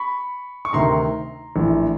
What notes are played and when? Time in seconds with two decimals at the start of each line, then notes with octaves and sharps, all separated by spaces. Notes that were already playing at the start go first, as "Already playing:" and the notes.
Already playing: B5 C#6
0.65 C#6
0.73 D2 C3 D#3 A#5 C6
1.56 A#1 A2 E3